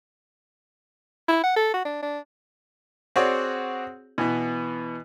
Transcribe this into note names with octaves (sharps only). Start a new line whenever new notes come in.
E4
F#5
A4
F#4
D4
D4
C4 F#4 G#4 C#5 D5
B2 E3 B3